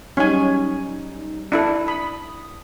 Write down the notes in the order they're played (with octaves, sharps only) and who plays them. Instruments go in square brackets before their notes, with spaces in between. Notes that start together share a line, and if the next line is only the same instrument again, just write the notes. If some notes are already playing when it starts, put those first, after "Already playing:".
[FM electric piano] F#3 G3 D#4 [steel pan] C#4 G#5
[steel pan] D4 E4 A4
[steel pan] B5 [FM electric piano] D#6